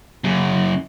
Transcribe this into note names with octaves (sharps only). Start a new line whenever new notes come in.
F#2 C#3